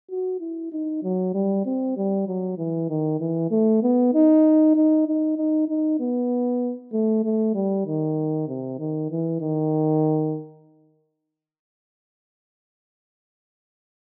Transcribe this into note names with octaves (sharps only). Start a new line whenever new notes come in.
F#4
E4
D#4
F#3
G3
C4
G3
F#3
E3
D#3
E3
A3
B3
D#4
D#4
D#4
D#4
D#4
B3
A3
A3
G3
D#3
C3
D#3
E3
D#3